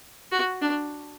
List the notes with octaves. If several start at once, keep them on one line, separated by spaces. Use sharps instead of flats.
F#4
D4